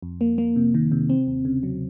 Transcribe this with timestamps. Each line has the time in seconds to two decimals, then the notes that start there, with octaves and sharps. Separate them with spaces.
0.02 F2
0.21 A#3
0.38 A#3
0.56 C3
0.74 D#3
0.92 C3
1.10 C4
1.27 D#2
1.45 C#3
1.63 F#3